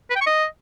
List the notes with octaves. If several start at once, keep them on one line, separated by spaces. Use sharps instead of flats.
B4
G5
C#6
D#5